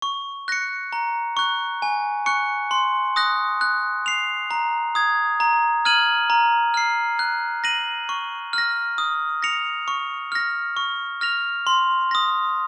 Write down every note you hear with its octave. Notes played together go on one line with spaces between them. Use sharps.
C#6
F#6 A#6 C#7
A#5
C#6 F#6
G#5
C#6 F#6 C#7
C6
D#6 F#6 A#6
F#6
C7 F7
A#5
D#6 G#6
A#5
F6 G#6 D#7 F#7
A#5
F6 C7
F#6
A#6 D#7 F#7
C#6
F6 A#6
D#6
A#6 C#7 F7
C#6
F6 A#6
C#6
F6 A#6 F7
C6
D#6 A#6